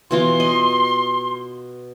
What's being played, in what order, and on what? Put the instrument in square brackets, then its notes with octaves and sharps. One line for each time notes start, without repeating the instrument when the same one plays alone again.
[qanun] B2 E3 F4 [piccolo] C6
[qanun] D#5